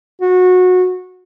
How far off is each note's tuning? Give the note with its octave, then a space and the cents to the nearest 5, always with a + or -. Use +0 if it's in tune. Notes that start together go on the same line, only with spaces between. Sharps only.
F#4 -20